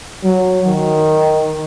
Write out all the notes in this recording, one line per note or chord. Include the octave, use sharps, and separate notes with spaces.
F#3
D#3